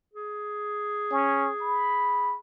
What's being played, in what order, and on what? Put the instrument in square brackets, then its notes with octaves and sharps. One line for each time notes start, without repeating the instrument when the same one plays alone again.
[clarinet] G#4
[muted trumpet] C#4
B5